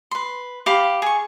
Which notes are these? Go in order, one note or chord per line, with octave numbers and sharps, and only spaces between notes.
B4 C6
G4 F5 B5 D6
G#4 C#6